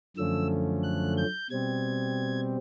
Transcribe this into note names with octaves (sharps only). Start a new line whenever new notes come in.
F#2 D3 F3 A3 C#4 E6
F#6
G6
B2 G3 C4 G#6